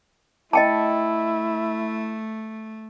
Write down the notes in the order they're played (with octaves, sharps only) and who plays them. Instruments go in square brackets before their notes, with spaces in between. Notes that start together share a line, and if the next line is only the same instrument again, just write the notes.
[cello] A3 [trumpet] E4 [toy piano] D#5 G5 A5